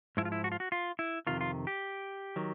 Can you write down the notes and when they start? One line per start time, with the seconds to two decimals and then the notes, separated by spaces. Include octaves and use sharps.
0.17 G#2 F3 E4
0.25 F4
0.32 E4
0.44 F#4
0.52 F4
0.60 F#4
0.72 F4
0.99 E4
1.27 F2 C3 D#3 F4
1.41 F4
1.67 G4
2.36 D#3 F#3